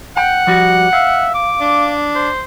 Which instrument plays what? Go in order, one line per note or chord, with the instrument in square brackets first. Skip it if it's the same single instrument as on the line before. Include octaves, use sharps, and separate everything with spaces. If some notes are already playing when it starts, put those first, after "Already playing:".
[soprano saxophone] F#5 [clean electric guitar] G5
[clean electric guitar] F3 G3 F#4
[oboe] E5 [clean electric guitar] F5
[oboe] D6
[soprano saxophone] D4
[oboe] C5